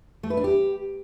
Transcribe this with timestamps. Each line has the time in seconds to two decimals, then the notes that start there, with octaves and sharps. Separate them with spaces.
0.23 A3
0.30 B4
0.37 D4
0.44 G4